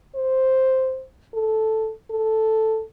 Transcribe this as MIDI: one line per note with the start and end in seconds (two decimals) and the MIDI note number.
0.15 1.04 72
1.34 1.91 69
2.10 2.83 69